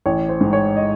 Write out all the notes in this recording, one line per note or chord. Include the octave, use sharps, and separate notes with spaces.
A1 C#5
C5
G#2
C#5
D#5